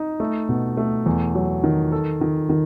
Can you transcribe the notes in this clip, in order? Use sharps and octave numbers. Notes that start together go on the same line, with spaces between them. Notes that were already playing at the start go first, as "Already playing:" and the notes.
Already playing: D#4
A3
B2
A3
E2
F#3
D#3
A4
D#3
D#3